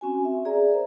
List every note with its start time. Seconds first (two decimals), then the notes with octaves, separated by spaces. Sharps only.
0.01 C4 C#4 F#4 G#5
0.25 E5
0.45 G#4 D5 E5 A#5
0.71 A#4 C5 E5